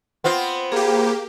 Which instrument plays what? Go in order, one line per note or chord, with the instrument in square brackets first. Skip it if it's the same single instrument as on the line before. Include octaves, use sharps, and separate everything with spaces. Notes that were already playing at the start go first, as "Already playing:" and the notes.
[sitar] B3 C4 F4
[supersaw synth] A#3 G4 [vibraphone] G#4